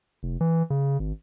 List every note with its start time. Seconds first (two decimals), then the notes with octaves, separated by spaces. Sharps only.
0.23 F1
0.41 E3
0.70 C#3
0.99 G#1